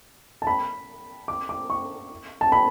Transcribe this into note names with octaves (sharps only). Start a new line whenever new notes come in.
A5
B5
D6
D6
C#6
A5
B5